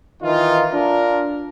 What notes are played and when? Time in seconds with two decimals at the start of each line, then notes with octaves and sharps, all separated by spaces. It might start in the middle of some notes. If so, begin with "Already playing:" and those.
0.23 D#3 E3 D#4 F4
0.72 D4 F4 A#4